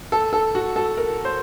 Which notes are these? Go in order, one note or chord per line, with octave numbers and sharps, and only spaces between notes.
A4
A4
F#4
A4
A#4
C5